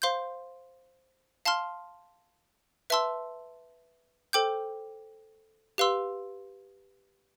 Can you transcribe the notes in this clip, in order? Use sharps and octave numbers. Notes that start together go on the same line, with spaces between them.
C5 F5 C6 G6
F5 A5 C6 F6
B4 E5 A5 C6 E6
A4 C5 G5 D6 G6
G4 B4 F5 C6 E6